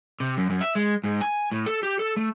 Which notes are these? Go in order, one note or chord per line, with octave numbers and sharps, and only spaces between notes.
C3
F#2
F#2
E5
G#3
G#2
G#5
A2
A4
G4
A4
A3